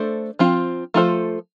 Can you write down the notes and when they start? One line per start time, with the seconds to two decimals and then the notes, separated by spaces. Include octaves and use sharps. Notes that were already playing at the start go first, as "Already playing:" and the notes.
Already playing: A3 D4 A4 C5
0.39 F3 C4 F4
0.94 F3 A3 F4 A4 C5